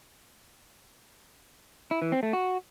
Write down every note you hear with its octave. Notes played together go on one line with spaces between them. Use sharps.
E4
E3
C4
A3
F#4